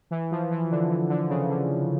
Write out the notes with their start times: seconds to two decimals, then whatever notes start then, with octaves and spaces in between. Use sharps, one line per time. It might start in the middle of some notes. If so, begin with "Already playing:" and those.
0.11 E3
0.31 F3
0.51 E3
0.71 D3
0.89 E3
1.10 D3
1.29 C#3
1.49 D3